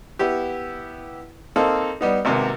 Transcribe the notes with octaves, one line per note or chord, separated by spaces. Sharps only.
B3 E4 G4
A#3 C4 D#4 A4 F5
G3 B3 D#4
G#1 C3 A#3 B3